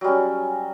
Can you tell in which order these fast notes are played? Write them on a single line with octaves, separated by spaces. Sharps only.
F#3 G3 C#4